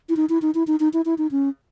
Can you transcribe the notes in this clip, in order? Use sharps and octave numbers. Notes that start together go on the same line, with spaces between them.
E4
D#4
E4
D#4
E4
D#4
D#4
E4
E4
D#4
C#4